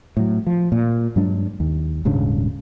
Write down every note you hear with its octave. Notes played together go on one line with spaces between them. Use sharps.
A2 F#3
F3
A#2
G2 F#3 G#3 D4
D#2
D#1 G#2 C#3 D4